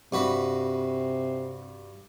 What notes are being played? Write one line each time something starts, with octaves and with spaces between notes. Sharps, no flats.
G2 C3 F#4 B4